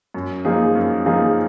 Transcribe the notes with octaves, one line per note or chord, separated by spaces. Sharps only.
F#2
F3 A#3 D#4 G#4
F#2
F3 A#3 D#4 G#4